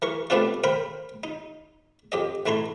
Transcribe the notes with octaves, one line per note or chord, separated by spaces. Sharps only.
E3 A#4 C#6
G3 A3 B3 C4 D4 F4
A#4 C5 F5 G5 B5 C6
D#4
F2 G4 D#5
A1 A3 E4 A#5 C6